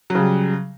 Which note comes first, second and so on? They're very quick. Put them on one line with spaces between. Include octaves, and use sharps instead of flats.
F#3 C#3 G3